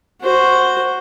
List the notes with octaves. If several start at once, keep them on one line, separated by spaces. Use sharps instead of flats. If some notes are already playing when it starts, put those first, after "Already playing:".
F#4 C5